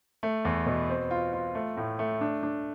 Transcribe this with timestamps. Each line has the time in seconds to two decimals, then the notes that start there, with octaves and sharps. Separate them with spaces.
0.23 A3
0.45 E2
0.66 B2
0.89 C4
1.11 F4
1.33 F4
1.55 A3
1.77 A2
1.99 A3
2.21 D4
2.43 D4